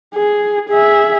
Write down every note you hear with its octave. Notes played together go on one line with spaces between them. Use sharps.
G#4
G#4 E5